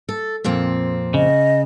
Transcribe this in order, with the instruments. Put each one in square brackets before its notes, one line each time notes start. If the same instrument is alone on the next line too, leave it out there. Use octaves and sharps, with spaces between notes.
[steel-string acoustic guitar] A4
F2 A#2 C4
[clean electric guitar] C#3 [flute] D#5